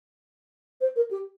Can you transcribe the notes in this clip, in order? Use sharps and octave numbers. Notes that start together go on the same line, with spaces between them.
C5
A#4
G4